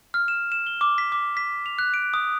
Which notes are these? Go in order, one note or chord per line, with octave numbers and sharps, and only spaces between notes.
F6
E7
E7
G7
D6
B6
D6
B6
F7
F#6
D7
D#6